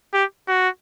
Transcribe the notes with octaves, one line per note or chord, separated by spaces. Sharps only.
G4
F#4